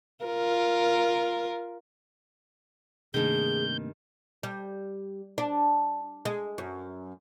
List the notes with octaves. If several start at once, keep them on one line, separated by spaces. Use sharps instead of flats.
F4 A#4
G2 C3 D#3 A3 A#3 G#4 G6
G3
D4
G#3
F#2